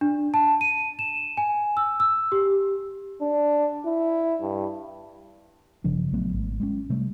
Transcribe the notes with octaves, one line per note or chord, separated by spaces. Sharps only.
D4
A5
D#7
E7
G#5
E6
E6
G4
D4
E4
G2
G1 C#3 F3 D4
A#1 F#3 A3 B3
G#1
G#3 A3 C#4
C3 G3 A3